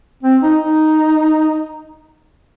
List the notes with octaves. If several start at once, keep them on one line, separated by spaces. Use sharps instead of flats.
C4
D#4
D#4